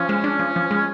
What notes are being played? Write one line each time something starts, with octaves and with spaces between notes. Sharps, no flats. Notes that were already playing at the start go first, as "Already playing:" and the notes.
Already playing: F3 C#4
G#3
D4
F3
F3
G#3